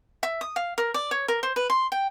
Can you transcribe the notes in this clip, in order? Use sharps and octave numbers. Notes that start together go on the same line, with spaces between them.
E5
D#6
F5
A#4
D5
C#5
A#4
C5
B4
C6
G5